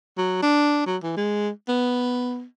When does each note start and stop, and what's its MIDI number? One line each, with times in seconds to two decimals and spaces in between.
0.17 0.38 54
0.42 0.85 62
0.86 0.97 54
1.03 1.13 52
1.17 1.49 56
1.68 2.44 59